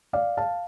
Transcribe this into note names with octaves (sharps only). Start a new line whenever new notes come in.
D5 F5
F5 A5